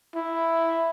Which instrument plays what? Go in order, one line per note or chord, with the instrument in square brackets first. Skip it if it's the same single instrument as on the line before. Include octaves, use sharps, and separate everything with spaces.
[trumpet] E4